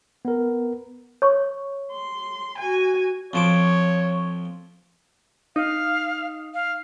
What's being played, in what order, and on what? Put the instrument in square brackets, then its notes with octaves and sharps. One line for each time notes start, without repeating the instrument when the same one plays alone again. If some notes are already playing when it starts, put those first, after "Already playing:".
[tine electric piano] B3 A#4
[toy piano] C#5 C#6
[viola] C6
F#4 G#5
[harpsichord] F2 F3 D6 [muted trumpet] C#5
[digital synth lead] D#4 [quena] F5
[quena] F5